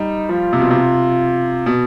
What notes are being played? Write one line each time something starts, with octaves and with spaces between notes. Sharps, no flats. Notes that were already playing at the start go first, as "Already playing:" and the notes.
Already playing: G3 D#4
F3 F4
C3
B2
C3
B2